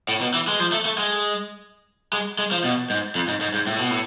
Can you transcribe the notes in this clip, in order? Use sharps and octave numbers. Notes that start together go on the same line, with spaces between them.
A2
B2
E3
G#3
F3
A3
A3
G#3
G#3
G#3
F3
B2
G#2
F2
G#2
G#2
G#2
A2
B2
A2